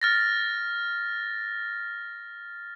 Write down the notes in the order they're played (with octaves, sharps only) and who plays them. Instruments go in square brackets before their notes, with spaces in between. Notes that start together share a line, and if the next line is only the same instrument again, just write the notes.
[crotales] F6 A6 A#6